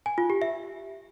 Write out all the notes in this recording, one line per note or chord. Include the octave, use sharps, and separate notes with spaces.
G#5
F4
G4
E5